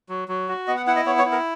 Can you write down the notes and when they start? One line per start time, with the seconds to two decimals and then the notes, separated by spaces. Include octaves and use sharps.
0.09 F#3
0.28 F#3
0.49 F#4
0.67 B3 D#5
0.77 F#5
0.87 E4 F#5
0.96 D#5
1.06 B3 C#5
1.18 C#5
1.26 E4
1.32 A#4